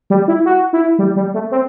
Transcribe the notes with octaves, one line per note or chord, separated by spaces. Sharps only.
G3
E4
F#4
E4
G3
G3
A3
C4